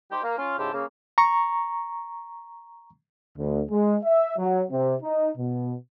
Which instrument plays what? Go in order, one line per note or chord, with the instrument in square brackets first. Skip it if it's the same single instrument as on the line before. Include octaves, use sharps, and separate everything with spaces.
[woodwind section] D#4 G4 C5
A#3
C#4 F4
G#2 C#3 E4 G4 A5 C6
C#3 A#3
[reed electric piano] A#5 C#6
[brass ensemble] D2
G#3
E5
F#3
C3
D#4
B2